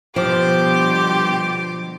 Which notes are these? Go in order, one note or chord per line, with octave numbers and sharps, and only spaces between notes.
B2 D3 F3 G3 G4 C6 D6